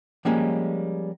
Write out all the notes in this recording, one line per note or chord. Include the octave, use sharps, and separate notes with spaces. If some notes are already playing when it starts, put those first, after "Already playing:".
F3 G3 G#3 A#3 C#4